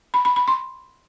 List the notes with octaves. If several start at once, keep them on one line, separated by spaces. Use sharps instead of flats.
B5
B5
B5
C6